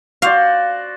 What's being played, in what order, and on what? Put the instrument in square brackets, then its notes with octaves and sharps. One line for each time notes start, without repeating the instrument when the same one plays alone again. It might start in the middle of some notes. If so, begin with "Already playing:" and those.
[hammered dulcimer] F#4 C5 D5 [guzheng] F5